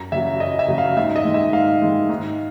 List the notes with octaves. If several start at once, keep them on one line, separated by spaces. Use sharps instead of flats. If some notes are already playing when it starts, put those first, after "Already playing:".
Already playing: F#2 A#5
C#3 F#3 E5
F#2 D#5
E5
C#3 F#3
F5
G#2 E5
D#5
D#3 G#3
E5
G#2 F5
D#3 G#3
G#2